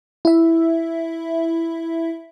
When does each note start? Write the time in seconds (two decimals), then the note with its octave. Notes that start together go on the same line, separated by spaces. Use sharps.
0.25 E4 E5